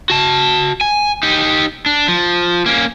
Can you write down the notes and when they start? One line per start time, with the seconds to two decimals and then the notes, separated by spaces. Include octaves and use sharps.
0.10 F#4 A5
0.81 G#5
1.23 D#4 G4
1.86 D4
2.08 F3
2.66 A#3 C#4